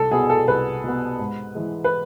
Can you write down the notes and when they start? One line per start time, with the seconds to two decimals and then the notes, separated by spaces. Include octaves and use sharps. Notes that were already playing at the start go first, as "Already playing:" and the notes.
Already playing: C2 A4
0.11 B2 B3 G#4
0.30 A4
0.48 C2 B4
0.84 B2 B3
1.19 G#2
1.55 E3 G#3
1.84 B4